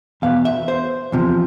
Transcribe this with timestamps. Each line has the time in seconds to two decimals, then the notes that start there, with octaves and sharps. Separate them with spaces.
0.22 E2 B2 B3 F5
0.45 E5
0.68 C5
1.12 E2 C3 F3